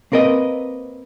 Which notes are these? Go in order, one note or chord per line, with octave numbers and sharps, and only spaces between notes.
A#3 C4 A#4 B4 D#5